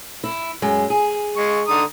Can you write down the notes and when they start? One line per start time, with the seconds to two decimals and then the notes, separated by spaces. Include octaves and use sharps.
0.24 E4
0.62 F#2 G#3
0.90 G#4
1.37 G#3 C#6
1.68 D3 A#5 D#6